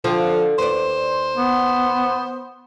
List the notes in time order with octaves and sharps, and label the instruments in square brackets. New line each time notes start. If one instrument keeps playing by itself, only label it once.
[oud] D3 F4 C5 [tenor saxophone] F3
[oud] D#2 B4 D5 [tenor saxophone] C5
[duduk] B3